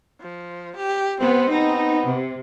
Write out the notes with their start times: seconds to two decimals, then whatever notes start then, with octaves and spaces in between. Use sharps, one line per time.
0.20 F3
0.76 G4
1.20 B3 C4 C5
1.51 B3 D#4
2.06 C3